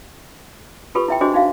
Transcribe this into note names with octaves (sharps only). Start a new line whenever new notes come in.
F4 G4 A4 B4 B5 C#6
E4 E5 G5
D4 E4 F#4 G#4 C5 D#5
D#4 F#4 E5 F5